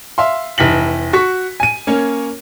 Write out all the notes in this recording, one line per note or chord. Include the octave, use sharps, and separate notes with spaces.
E5 F5 C6
F1 E3 B6 F#7
F#4 C#6 B6
G#5 D#7
A#3 C#4 C#5